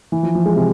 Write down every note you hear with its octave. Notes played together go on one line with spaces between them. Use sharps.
E3
F3
F3
G#3
C3